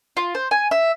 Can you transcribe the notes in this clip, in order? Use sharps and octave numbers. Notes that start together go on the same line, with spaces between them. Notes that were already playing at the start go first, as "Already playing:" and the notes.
F4
C5
G#5
E5